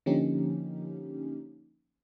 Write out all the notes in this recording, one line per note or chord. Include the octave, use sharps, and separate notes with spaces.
D3 F3 A#3 C#4 D#4 G4